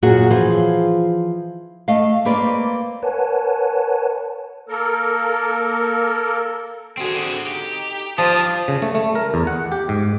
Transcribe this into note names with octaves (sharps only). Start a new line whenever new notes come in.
F#2 A#2 F#4 G#4
E3 F3 F4 G#4 C5
A3 D#5 F5
A#3 C4 B4 C5 D5
A#4 B4 C#5 F#5 G#5 A5
A#3 A4 A#4
D3 C4 F#4 G#4
D#4 G4
F3 D4 F4 G4 A5 D#6
C#3
A3
A3
A#4
E2
F#5
G4
G#2